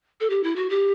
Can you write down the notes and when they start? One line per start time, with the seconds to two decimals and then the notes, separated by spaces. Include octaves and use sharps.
0.20 A4
0.30 G4
0.43 E4
0.56 F#4
0.70 G4